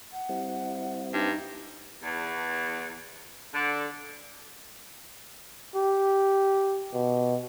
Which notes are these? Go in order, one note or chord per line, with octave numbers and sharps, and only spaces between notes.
F#5
G3 C4 E4
G2 D#4
E2
D3
G4
B2